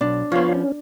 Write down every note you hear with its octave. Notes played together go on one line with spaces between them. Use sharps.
B1 D4
F3 B3 F4 C#5 F5
C#4